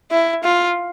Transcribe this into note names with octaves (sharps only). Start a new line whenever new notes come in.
E4
F4